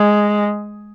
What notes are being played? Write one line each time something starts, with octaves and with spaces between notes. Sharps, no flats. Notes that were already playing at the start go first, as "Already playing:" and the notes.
Already playing: G#3